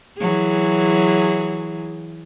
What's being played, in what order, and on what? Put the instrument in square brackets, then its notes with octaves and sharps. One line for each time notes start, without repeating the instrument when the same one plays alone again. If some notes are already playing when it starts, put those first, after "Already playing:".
[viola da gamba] E3 F#3 G#4